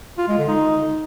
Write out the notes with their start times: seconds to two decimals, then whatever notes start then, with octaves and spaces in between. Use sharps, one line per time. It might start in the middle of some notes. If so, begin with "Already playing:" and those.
0.18 F4
0.28 G#3
0.38 D3
0.48 D#4